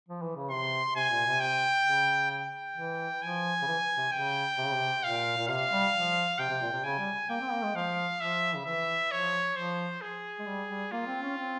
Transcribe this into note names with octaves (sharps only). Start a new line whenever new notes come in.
F3
E3
C#3
C3 C6
C3 G#5
A#2
C3
G5
C#3
G5
E3
F3 G#5
C#3
E3
C3
C#3 G5
C3
C#3
C3
A#2 F5
A#2
C3 F5
G3
F3
C3 G5
C3
A#2
C3
C#3 G#5
G3
A#3 G5
C4
A#3
G#3
F3 F5
F3 E5
C#3
E3 E5
F3 C#5
F3 C5
G#4
G#3
G3
G3
A#3 F4
C4
C#4
C4